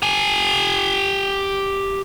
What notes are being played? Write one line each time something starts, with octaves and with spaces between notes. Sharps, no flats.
G4 G#5